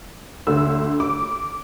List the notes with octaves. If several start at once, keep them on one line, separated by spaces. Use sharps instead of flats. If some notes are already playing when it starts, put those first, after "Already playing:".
D2 D3 A3 E6
D6